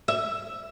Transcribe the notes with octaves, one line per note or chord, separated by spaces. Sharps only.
E5